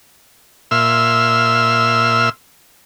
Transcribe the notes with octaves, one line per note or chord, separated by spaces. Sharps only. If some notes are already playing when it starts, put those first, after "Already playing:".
A#2 E5 C6 E6 F6